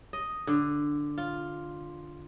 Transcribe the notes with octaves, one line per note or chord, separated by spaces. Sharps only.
D#5
D3
F4